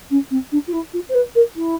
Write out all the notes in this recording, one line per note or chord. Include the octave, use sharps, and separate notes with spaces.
C#4
C4
D4
F4
E4
F4
C5
B4
A#4
E4